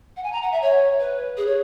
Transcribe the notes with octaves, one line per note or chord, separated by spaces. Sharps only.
F#5
G#5
A#5
F#5
E5
C#5
B4
G#4
C#5